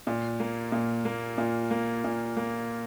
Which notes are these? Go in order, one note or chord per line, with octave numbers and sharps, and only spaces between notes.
A#2
A#3
A#2
A#3
A#2
A#3
A#2
A#3